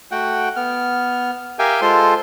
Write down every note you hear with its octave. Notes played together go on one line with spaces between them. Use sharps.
A3 F#4 F#5 G5
B3 F6
G4 A#4 E5 F5 G5 G#5
G#3 F4 A4 C5 C6